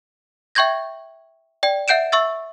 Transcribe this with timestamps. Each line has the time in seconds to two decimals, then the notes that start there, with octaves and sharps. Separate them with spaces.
0.55 E5 G5 C#6 G6 G#6 A#6
1.63 D5 G5
1.88 E5 F#5 G6 D7 E7
2.12 E5 C#6 E6 A6